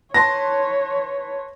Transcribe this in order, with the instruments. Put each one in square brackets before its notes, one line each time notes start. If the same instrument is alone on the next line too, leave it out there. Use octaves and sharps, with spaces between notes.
[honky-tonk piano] B4 A5 C6 [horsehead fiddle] C#5 [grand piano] A#6